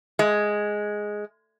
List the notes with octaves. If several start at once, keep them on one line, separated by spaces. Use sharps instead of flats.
G#3